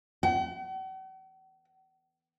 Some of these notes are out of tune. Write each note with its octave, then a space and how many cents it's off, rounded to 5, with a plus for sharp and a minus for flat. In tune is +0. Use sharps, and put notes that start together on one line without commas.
F#5 +45